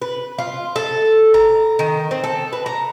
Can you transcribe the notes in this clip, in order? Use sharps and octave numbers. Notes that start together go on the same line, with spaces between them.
B4
F4
A4
A#5
D#3
C4
A4
B4
A#5